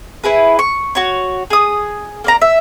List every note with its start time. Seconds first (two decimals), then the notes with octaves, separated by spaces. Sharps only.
0.24 E4 G#4 B4
0.59 C#6
0.95 F#4 C#5
1.50 G#4 D#6
2.24 A#3 D5 A#5
2.41 E5